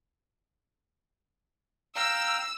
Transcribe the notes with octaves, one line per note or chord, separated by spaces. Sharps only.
F5 G5 A#5 E6